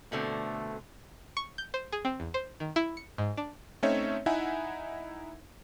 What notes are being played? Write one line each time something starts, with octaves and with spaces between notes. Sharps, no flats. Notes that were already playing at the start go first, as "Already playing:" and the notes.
B2 D3 A3 C4
C#6
G6
C5
G#4
C4
E2
C5
D#3
E4
C#7
G#2
D4
A3 C4 C#4 D#4 C#5 E5
D#4 E4 E5 F#5 G#5